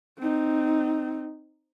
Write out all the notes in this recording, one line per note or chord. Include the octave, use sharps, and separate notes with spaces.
C4 D#4